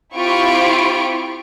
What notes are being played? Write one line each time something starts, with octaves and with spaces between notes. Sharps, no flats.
C4 E4 F4 G4 C#6 D7